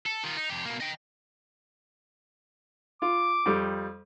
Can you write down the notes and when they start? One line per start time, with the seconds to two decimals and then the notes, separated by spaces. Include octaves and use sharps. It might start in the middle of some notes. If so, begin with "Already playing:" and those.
0.06 A4
0.23 D#3 F4
0.37 D#4
0.50 F2 G4
0.65 B2 A#3
0.81 D#5 G5
3.02 F4 D6
3.46 F2 G3